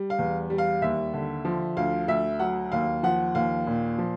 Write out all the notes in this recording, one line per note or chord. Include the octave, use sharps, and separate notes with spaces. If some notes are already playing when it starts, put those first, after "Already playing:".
Already playing: G3
F5
E2
G3
F5
D#2 E5
D3
F3
D2 F5
D2 E5
F#3 F#5
D#2 F5
F3 F#5
D#2 F5
A#2
F3